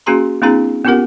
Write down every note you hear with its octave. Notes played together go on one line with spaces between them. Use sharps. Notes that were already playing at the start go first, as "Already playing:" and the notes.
A#3 C#4 F#4 G#4 A#5 C6
A#3 C4 D4 E4 G#4 A#5
B3 C#4 F4 G4 A#4 F#5